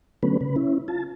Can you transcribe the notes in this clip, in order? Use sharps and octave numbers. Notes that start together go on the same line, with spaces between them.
D3 F#3 A3 B3 C#4 B4
C#3 B4
C#4 E4
F4 A5